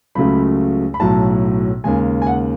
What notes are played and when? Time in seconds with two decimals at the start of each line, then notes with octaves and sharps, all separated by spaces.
0.15 C#2 C#3 F#3 A3 B5
0.94 B5
1.00 B1 A2 F#3 A5
1.84 D#2 C#3 G#3 G#5
2.22 G#5
2.27 F#5